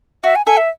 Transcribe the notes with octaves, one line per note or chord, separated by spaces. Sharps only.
F#4 E5
G#5
A4 E5 G#5
E5